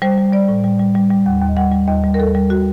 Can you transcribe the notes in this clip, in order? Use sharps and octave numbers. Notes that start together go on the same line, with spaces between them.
G3 C5
G3
G3 D5
A2
G3
G3
G3
G3
D#2 F#5
D#2
D#5
G3 F#5
G3
D#2 D#5
G3
A#4
D#2 A4
G3
F#4